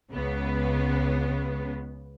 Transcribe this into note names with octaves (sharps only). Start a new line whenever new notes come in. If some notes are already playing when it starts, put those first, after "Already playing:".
C#2 C#3 B3